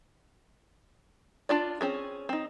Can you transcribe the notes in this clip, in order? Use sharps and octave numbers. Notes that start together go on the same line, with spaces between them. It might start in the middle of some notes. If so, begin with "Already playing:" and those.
D4 F4 D5
C4 C#4 G#4
C4 D#4